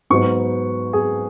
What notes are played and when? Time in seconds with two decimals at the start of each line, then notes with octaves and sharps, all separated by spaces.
0.10 G#2 F#3 B3 C#6
0.93 G#4